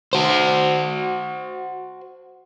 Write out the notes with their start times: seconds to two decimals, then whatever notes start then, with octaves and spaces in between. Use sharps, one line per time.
0.13 F#4 C5